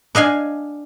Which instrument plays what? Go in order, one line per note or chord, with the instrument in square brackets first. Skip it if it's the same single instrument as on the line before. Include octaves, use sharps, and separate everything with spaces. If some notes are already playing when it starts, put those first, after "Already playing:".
[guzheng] D4 D#5 F5 G#5